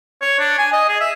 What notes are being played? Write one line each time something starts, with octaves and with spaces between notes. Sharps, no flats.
C#5
D4
G#5
D#5
G#4
E5